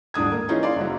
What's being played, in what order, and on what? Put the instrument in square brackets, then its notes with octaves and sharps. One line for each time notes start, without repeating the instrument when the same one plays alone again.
[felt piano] D#1 G#2 D4 D#6 G#6
A#3
E3 C#4 D#4 F4 G#4
D5 F5 C6
F#1 C#3 F#3